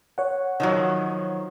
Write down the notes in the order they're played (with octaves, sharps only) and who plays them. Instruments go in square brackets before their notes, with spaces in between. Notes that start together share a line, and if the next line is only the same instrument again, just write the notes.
[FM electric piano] C#5 F#5
[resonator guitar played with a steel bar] D#3 F3 F#3